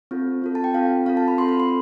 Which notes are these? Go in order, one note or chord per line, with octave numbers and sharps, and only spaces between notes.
C4 F4 A4
C4 F4 A4
A5
G5
C4 F4 A4 F5
C4 F4 A4 F5
A5
B5
C4 F4 A4 C6
B5
C6